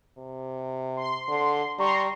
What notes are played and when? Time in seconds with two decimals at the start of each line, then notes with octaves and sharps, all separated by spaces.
0.18 C3
0.97 C6
1.28 D3
1.79 G3 A#5 C6 C#6